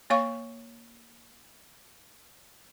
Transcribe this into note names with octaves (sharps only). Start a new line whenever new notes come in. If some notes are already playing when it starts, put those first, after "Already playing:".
A#3 C#5 F5 C#6